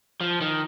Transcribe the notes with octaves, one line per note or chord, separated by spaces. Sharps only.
F3
D#3